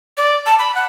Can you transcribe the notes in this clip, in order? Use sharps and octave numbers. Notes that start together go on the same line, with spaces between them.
D5
A5
B5
F#5